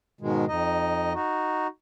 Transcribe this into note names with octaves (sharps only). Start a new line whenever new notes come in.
G#2 B2 D#3 G#3
F2 D#4 D#5
D#4 F#4